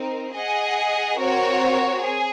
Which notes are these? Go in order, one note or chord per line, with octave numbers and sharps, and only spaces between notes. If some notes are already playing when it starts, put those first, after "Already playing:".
Already playing: C4 D#4 A#4
G#4 D#5 F#5
C4 F#4 A#4 C#5
G#4